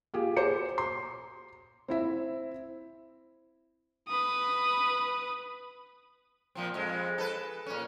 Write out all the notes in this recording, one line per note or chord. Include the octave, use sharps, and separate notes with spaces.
F4 G4 G#4
F#4 C5 D6 C#7
C6
C4 E4 E5
B4 D#6
A#2 F3 C4
F2 G#3
A4 B4
A#2 C#4